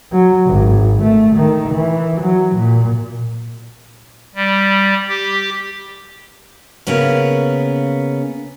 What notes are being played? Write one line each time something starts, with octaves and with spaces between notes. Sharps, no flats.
F#3
G#1
A3
D#3
E3
F#3
A#2
G3
G4
C#3 A#3 B3 C#4